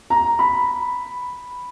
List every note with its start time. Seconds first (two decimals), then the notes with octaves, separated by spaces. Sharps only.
0.10 A#5
0.39 B5